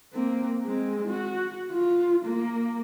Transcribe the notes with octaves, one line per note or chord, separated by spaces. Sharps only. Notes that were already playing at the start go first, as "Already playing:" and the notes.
A#3 C4
G#3 C4
F#4
F4
A#3